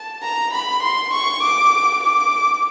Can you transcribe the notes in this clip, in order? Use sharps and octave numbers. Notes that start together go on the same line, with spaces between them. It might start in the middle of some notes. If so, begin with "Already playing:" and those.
Already playing: A5
A#5
B5
C6
C#6
D6
D6